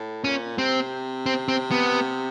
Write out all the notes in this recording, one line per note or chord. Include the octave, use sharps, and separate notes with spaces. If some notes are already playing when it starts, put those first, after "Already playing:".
Already playing: A2
A#2 C#4
C3 C4
C4
C4
B3